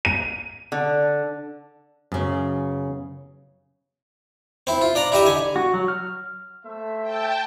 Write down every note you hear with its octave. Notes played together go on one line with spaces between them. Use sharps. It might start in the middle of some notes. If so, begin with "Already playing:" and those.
D#7
D3
F#2 C#3 B3
C4 E4
F4
D4 D5 A#5
E4 G4 D#5 E5
D3 G#5
F#4
F#3
F6
A3 C5 E5
G5 A5